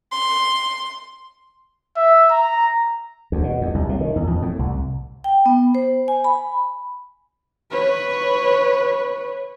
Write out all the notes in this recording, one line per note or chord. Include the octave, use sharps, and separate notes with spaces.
C6
E5
A#5
D2
B2
E2
C2
A2
D#3
E2
F2
A2
C2
G5
B3
C5
G#5
B5
B4 C#5